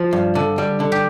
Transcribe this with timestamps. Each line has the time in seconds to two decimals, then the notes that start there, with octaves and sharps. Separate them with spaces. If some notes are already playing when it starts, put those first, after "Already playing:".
Already playing: F3 C5
0.13 G2
0.35 D3
0.58 G3
0.80 D3
0.92 G4